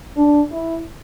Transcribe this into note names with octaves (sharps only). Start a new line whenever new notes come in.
D4
E4